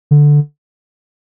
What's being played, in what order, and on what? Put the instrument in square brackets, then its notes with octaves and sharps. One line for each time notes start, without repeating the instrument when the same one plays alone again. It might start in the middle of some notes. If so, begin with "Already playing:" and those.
[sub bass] D3